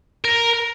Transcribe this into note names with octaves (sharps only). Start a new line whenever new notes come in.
A#4